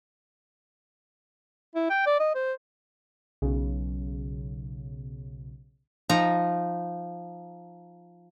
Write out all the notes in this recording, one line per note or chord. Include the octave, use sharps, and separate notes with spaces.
E4
G5
D5
D#5
C5
B1 C#3
F3 D#4 A#5